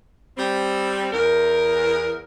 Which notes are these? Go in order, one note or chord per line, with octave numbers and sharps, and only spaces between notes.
G3 C4
E2 A#4